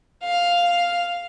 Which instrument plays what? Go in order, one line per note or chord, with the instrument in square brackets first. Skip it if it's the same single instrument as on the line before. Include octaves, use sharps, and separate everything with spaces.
[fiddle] F5